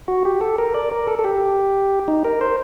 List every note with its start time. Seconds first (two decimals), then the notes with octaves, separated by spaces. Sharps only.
0.08 F#4
0.25 G4
0.41 A4
0.58 A#4
0.74 D5
0.91 A#4
1.07 A4
1.19 A4
1.24 G4
2.08 D#4
2.24 A#4
2.41 C5